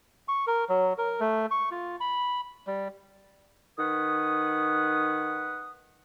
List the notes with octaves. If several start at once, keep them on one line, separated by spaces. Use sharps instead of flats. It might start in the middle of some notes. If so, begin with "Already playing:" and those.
C#6
A#4
F#3
A#4
A3
C#6
F4
B5
G3
D#3 B4 F#5 D#6